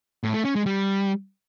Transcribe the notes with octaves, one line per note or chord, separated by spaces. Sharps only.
A2
A3
C#4
G#3
G3